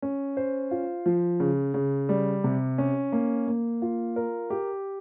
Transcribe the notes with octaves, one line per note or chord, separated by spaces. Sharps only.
C#4
C5
F4
F3
C#3
C#3
G3
C3
C#4
A#3
A#3
F4
A#4
G4